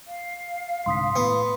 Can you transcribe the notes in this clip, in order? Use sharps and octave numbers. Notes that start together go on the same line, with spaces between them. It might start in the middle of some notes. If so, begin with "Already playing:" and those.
F5
C2 G#2 D3 C6 D#6 B6
A2 B3